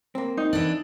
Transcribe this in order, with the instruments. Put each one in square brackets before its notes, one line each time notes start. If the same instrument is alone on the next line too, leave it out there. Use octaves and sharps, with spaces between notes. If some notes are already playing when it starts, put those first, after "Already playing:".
[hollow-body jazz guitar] A#3 C4
[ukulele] D#4
[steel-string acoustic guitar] E3 D4